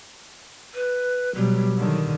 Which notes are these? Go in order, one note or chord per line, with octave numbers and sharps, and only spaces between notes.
B4
B2 F#3 G3
D3 D#3